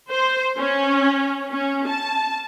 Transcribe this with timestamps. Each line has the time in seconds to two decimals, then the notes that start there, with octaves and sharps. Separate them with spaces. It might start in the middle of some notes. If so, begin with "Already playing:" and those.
0.10 C5
0.58 C#4
1.51 C#4
1.87 A5